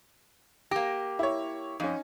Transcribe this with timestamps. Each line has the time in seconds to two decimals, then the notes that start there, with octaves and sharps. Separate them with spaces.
0.71 A#3 G4 A#6
1.19 E4 C#5
1.80 F2 C#4 D#4